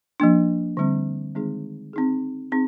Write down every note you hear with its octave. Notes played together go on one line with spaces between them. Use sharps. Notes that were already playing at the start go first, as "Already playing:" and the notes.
F3 A#3 D4
D3 G3 C4
D#3 G#3 C4 D#4 G#4
C4 D#4 G#4
C4 D#4 G#4